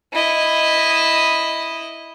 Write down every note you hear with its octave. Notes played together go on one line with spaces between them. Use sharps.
E4 D#5